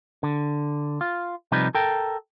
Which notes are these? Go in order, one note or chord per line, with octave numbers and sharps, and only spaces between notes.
D3
F4
C3 F3 G3 D#4 B4
A4 A#4 G5